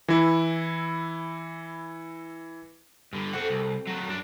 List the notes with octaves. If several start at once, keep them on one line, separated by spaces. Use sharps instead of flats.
E3 E4
G2 D3
C4 F#4 A4 C5 F#5
C2
F#3 A3
F#2 D4